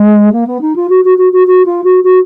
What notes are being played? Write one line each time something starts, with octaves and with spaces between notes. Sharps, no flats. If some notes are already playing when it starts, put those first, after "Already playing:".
Already playing: G#3
A#3
B3
D#4
F4
F#4
F#4
F#4
F#4
F#4
F4
F#4
F#4